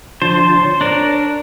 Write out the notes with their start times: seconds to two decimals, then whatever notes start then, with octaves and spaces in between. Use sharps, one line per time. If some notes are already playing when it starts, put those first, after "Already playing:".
0.22 D3 F3 C5 A5
0.60 C#5
0.81 D4 A#4